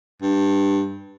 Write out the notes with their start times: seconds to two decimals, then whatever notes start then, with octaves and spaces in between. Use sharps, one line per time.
0.22 G2